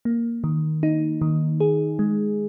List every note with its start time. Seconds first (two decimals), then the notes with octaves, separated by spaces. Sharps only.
0.05 A#3
0.44 D#3
0.83 D#4
1.21 D#3
1.60 G#4
1.99 G#3